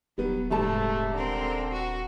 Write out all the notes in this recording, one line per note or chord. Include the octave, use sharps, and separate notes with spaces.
D#1 F#3 G3 B3
G#2 C3 G3 A3 A5
D3 C4 A#4
F#4